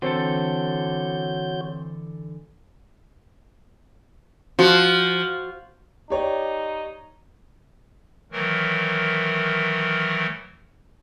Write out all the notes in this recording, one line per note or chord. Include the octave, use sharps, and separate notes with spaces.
D3 E3 C4 F#4 A4 C#5 G6
F3 F#4
D#4 G4 C#5 D5
D#3 E3 F#3 A3 A#4